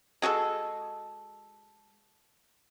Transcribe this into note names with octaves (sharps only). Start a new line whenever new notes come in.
G#3 F#4 G#4 A4